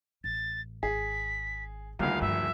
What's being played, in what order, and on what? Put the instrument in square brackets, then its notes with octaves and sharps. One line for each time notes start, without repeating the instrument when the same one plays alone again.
[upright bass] A1 [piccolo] A6
[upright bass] G#1 [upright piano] G#4 [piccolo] B6
[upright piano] D#1 D2 [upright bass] G3 E4 [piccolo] F5
[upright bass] G2 F3 [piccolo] E5